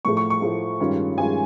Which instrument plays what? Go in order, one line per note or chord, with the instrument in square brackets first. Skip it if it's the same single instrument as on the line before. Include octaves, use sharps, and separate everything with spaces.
[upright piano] A2 F3 A3 C#6
C#6
C#6
A2 F3 A3
G2 D#3 G#3 C#4 F4
G2 D#3 G#3 C#4 F4 G#5